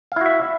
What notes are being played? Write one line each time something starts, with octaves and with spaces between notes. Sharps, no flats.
E4 F#4 E5 F5